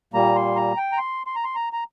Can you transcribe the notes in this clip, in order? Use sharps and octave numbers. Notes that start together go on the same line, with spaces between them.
A#2 G3 A#3 A#5
C6
A#5
G5
A#5
C6
C6
A#5
C6
A#5
A#5